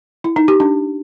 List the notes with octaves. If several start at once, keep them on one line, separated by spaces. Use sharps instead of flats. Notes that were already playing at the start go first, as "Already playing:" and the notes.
E4
D#4
G4
D4